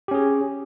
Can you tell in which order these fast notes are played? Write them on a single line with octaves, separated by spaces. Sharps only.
G4 C#4 G#4